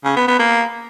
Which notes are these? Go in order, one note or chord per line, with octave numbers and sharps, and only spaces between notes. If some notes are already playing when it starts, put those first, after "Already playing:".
C#3
B3
B3
A#3